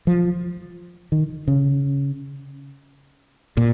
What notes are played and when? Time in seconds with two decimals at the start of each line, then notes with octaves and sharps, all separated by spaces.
0.07 F3
1.12 D#3
1.48 C#3
3.57 A#2